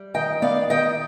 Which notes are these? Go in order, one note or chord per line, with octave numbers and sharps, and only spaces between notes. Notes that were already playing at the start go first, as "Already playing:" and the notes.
Already playing: G3
D#3 D#5 G5
B3 D5 F5
D#3 D#5 G5